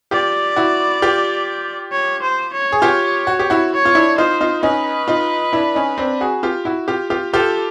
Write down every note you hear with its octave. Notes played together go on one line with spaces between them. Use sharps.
F4 G4 D5
E4 F#4
F4 G4
C#5
C5
C#5
G#4
F4 G4 C#5
F#4
G4
E4 F#4
C#5
F4
D4 E4
D#4 F4 C5
D#4 F4
C#4 D#4 B4
D#4 F4
D4 E4
C#4 D#4
C4 D4
F#4 G#4
F4 G4
E4 F#4
F4 G4
F4 G4
F4 G4 A4